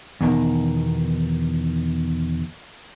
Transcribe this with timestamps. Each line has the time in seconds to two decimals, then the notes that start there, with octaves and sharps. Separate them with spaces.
0.21 E2 B2 D#3